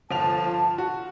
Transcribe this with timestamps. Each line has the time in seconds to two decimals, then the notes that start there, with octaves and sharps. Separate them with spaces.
0.11 G1 F3 A5 F7
0.47 F4
0.78 F#4